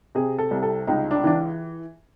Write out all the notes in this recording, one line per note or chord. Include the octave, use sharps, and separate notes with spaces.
C3 G#4
A4
C2
A4
C#2 D#4
D4
E3 D4